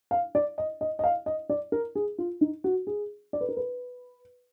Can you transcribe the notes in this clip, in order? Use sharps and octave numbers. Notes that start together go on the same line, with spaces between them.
F5
D5
D#5
D#5
D#5
F5
D#5
D5
A#4
G#4
F4
D#4
F#4
G#4
D5
B4
A#4
B4